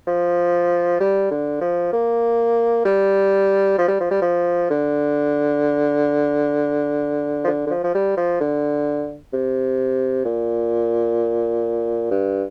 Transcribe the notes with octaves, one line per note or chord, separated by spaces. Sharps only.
F3
G3
D3
F3
A#3
G3
F3
G3
F3
G3
F3
D3
F3
D3
D3
F3
F3
G3
F3
D3
C3
A#2
G2